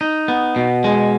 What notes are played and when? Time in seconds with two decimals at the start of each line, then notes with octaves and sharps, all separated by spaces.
0.01 D#4
0.28 B3
0.56 B2
0.84 G#3